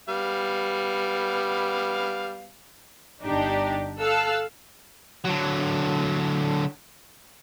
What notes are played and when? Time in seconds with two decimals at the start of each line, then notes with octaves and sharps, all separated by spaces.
0.09 G3 B3 F5
3.22 G1 D4 D#4 G4
4.01 A4 F5 E6 F#6
5.25 D3 F#3